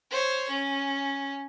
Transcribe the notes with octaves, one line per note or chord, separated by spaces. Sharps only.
C5 C#5
C#4